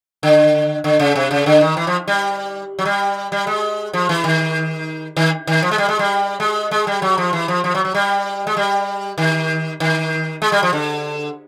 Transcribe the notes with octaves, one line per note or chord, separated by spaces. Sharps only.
D3
D3
C#3
C3
C#3
D3
D#3
E3
F3
G3
F#3
G3
G3
G#3
F3
E3
D#3
D#3
D#3
F3
G#3
G3
G#3
G3
G#3
G#3
G3
F#3
F3
E3
F3
F3
F#3
F#3
G3
G#3
G3
D#3
D#3
G#3
G3
F3
D3